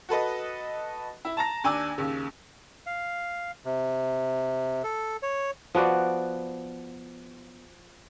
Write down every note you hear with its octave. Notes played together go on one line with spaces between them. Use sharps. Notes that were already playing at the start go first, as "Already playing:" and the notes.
F#4 A4 B4 D#5
E4
A5 A#5 A#6
D#2 D4 G#5 D6 E6
D#2 C#3
F5
C3
A4
C#5
F3 B3 F#4 D5